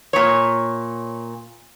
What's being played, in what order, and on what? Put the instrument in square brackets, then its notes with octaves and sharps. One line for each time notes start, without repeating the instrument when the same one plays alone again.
[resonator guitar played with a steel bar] A#2 C#5